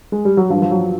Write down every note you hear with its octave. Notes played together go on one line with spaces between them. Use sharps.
G#3
G3
F#3
G2 F3
F3
F#3